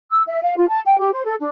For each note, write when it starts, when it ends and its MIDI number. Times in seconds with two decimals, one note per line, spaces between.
0.09 0.20 88
0.26 0.39 76
0.42 0.54 77
0.55 0.66 65
0.67 0.79 81
0.85 0.95 79
0.98 1.10 67
1.11 1.21 72
1.25 1.33 69
1.38 1.49 62